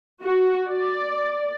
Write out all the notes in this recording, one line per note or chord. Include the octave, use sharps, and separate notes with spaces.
F#4
D5